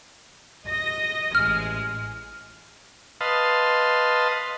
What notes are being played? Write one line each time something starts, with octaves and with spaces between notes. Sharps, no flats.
D#5 A#6
A1 G#3 F6
B4 D#5 F5 A5 C6